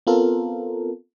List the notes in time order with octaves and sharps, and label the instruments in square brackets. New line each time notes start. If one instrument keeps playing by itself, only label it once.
[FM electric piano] B3 C4 F4 A4 A#4